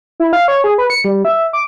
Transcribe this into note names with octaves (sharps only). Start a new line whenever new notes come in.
E4
F5
C#5
G#4
B4
C#7
G3
E5
D6